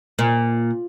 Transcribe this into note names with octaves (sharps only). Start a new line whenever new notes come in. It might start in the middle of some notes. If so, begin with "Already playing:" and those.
A#2